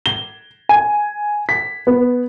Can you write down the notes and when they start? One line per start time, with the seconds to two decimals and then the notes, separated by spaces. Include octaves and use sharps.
0.06 G7
0.69 G#5
1.49 B6
1.87 B3